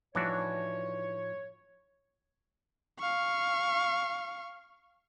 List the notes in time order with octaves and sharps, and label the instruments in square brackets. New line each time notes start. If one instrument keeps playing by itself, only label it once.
[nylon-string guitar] A2 F3 D#4 [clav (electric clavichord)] E3 D4 F#4 [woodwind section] C#5
[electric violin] F5 C#6